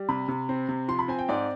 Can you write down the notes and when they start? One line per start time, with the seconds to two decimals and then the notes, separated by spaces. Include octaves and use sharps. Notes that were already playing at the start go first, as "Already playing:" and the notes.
Already playing: G3
0.09 C3 B5
0.28 C3
0.49 C4
0.69 C3
0.88 F3 C6
0.99 B5
1.08 C4 G#5
1.19 G5
1.28 G#2 D5